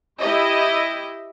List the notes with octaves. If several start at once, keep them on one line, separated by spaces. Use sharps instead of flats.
E4 G4 D#5 E5